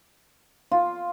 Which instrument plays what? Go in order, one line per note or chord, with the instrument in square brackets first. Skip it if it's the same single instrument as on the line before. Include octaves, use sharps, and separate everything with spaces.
[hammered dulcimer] F4